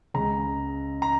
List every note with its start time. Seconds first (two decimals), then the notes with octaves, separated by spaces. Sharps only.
0.14 C#2 C#3 G#3 A#5
1.02 A#5